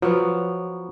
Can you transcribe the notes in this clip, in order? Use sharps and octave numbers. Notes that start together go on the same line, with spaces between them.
F3 F#3 B3